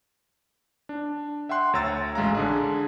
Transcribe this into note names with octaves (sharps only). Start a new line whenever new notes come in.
D4
E5 F#5 G5 C6 F#6
D2 C#5 A#5 E6 A6
A1 G#3 F5 A#5
D3 D4 G#4